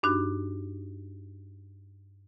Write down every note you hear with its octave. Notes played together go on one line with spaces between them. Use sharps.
G2 D4 D#4 F#4